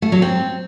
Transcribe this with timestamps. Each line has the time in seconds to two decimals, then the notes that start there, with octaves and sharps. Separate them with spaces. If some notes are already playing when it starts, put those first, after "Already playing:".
0.02 A3
0.12 F#3
0.22 C4